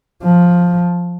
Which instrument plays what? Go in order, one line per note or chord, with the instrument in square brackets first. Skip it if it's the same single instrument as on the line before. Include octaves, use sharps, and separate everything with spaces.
[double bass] F3